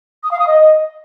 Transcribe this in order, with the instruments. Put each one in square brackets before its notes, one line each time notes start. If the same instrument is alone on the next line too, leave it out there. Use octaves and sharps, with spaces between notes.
[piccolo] D#6
F5
D#6
D#5